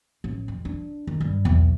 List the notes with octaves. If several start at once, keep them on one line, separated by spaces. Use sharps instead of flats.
A1
F2
D4
D#3
G2
B1 E2